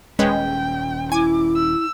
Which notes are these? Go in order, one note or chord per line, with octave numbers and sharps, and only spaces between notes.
D#1 G#3 C#4 B4 C#5 G5
E4 G#5 D6
E6